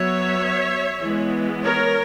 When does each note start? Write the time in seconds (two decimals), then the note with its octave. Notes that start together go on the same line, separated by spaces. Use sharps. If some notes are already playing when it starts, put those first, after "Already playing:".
Already playing: F#3 B3 C#5 E5
1.02 E3 G#3 B3
1.64 A#4 C#5